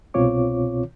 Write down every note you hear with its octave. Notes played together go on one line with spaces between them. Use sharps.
C2 B2 C4 F4 C#5 D6